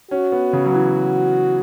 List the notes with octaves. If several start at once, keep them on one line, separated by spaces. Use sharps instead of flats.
C#4 F#4
B3
C#3
F#3
E3